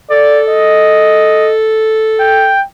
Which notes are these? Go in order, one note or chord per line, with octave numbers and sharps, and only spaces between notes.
A4 D5
D#5
G5